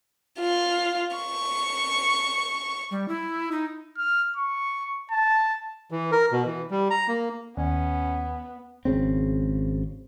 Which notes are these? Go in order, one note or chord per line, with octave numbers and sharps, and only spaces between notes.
F4
C#6
G3
E4
D#4
F6
C#6
A5
E3
A#4
B2
E3
G3
A#5
A#3
D#2 B3 C#4
G#1 C#3 C4